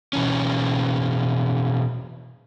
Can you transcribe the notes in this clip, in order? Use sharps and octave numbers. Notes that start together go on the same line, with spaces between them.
B2 E3 C#4